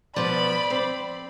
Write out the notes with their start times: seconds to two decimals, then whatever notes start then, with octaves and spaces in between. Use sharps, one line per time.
0.16 B2 F3 D5 B5
0.70 C4